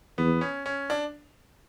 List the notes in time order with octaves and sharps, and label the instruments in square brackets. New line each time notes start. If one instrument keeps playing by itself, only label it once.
[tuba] E2 [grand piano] B3
[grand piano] C#4
C#4
D4